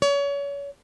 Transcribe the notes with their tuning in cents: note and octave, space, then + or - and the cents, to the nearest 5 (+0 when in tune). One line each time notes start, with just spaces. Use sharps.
C#5 +30